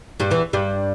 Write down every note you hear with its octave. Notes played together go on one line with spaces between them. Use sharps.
G2 G3
E2 E3
G2 G3